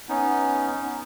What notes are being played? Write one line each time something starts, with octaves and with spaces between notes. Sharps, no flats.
B3 C#4 D#4